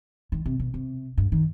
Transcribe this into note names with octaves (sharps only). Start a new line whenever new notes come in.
D#3
C3
B2
C3
G2
D#3